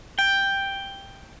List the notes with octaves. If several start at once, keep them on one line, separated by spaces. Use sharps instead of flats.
G5